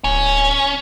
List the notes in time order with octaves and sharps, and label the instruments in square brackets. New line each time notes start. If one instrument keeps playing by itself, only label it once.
[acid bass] D1 [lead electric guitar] C#4